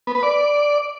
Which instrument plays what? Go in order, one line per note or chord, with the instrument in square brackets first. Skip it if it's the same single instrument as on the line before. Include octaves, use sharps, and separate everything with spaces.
[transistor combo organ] B3
B4
D5